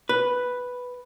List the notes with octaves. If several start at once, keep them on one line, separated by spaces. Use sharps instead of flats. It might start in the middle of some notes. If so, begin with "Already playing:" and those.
B4